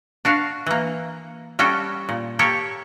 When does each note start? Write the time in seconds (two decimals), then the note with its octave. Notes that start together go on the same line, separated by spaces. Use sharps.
0.25 D4 F#4 F5
0.66 E3 A#3
1.59 G3 C#4 F#4 A4 G5
2.09 A#2
2.39 A#3 G4 A4 C#5